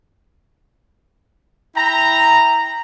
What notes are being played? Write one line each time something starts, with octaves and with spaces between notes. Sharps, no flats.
E4 G5 A#5